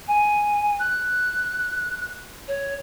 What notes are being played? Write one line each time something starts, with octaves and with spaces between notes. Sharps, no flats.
G#5
F#6
C#5